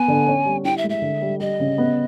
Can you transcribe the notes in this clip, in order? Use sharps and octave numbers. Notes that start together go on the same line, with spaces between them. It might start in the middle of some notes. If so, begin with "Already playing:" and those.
Already playing: B3 G#5
D3
C#4
G3
E4 G5
E5
G#3
E5
D3
G3
G3 D#5
C#3
B3